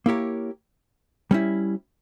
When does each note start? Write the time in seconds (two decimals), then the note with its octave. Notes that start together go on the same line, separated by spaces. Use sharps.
0.06 A#3 E4 G4 A#4 C#5
1.31 G3 C#4 E4